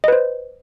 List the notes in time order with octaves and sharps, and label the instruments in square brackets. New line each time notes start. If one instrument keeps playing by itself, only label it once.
[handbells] D#5
B4
C5